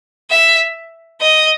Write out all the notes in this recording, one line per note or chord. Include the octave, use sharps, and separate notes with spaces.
E5
D#5